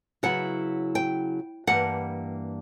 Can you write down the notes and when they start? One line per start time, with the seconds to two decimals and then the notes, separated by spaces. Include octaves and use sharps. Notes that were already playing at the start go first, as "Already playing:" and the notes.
0.23 C#3 F#3 B3 E4 F#5
0.95 G5
1.67 G2 E3 G3 A#3 F#5